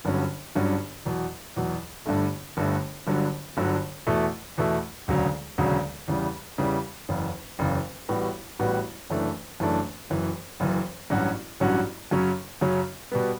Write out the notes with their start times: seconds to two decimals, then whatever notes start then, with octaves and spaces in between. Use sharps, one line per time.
0.05 G1 G2 D3 F#3 C#4
0.55 G1 G2 D3 F#3 C#4
1.05 E2 B2 F#3
1.56 E2 B2 F#3
2.06 G1 G2 D3 A3
2.57 G1 G2 D3 A3
3.07 G1 G2 D3 F#3
3.57 G1 G2 D3 F#3
4.07 E2 B2 A3 E4
4.58 E2 B2 A3 E4
5.08 E1 D2 C#3 F#3
5.58 E1 D2 C#3 F#3
6.08 E2 C#3 E3 G3
6.58 E2 C#3 E3 G3
7.09 F#1 E2 C#3
7.59 F#1 E2 C#3
8.09 A1 A2 G3 B3 F#4
8.59 A1 A2 G3 B3 F#4
9.10 F#1 F#2 E3 A3 D4
9.60 F#1 F#2 E3 A3 D4
10.10 F#1 F#2 E3
10.60 F#1 F#2 E3
11.10 A1 G2 F#3 C#4 F#4
11.60 A1 G2 F#3 C#4 F#4
12.11 F#2 C#3 F#3 C#4
12.61 F#2 C#3 F#3 C#4
13.12 B2 G3 B3